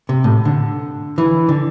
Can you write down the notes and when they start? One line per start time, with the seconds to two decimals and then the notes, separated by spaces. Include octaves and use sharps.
0.09 C3
0.24 A2
0.45 D3
1.18 E3
1.49 D3